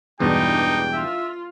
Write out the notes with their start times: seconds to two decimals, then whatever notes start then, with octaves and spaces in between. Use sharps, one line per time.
0.20 E2 G2 B2 E3 G#3 D4 D#4 G5
0.93 F4 E5